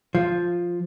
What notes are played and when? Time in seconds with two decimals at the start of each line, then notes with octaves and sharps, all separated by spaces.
0.15 F3